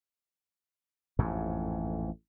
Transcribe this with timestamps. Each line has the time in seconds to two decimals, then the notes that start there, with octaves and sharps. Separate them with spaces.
1.19 A1 F2 G#2